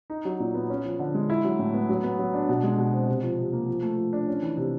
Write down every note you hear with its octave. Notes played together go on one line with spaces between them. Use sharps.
D#4
F#3
A#2
B3
C#4
F3
D3
G#3
E4
F#3
A2
B3
F#3
B3
F#3
D4
B2
G#3
B2
C4
C3
F3
C3
A#3
F3
A3
F3
D4
C#4
E3
C3